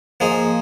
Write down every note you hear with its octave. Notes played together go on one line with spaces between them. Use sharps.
F3 A#3 D#4 G#4